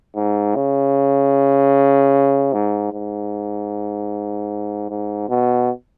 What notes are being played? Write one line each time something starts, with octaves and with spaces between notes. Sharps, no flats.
G#2
C#3
G#2
G#2
G#2
B2